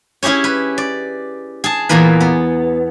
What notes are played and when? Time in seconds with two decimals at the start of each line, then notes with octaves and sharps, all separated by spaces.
0.23 C#4 E4 G4 G#4 C#5
0.44 B4
0.78 D5
1.64 G#4 A5
1.89 E2 A#2 E3 A#3 B4
2.20 B3